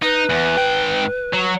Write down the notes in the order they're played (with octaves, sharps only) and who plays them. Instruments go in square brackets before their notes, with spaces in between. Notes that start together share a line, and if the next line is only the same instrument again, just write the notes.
[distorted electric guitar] D#4 [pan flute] B4
[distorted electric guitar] E2
G#2 G5
F#3